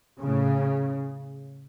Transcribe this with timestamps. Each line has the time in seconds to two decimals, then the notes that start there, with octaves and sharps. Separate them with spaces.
0.22 A2 C#3